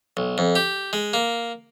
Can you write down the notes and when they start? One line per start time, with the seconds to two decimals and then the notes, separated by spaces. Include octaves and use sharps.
0.17 B1
0.38 F2
0.56 G4
0.93 G#3
1.13 A#3